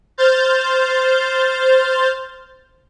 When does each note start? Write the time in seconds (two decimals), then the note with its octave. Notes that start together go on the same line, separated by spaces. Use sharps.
0.18 C5 F6 G6 A6